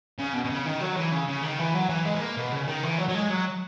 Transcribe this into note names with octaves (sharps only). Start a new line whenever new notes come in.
C#3
B2
B2
C#3
D#3
F#3
E3
C#3
C#3
D#3
E3
F#3
E3
G#3
B3
A#3
B2
C#3
D#3
E3
F#3
F#3
G#3
F#3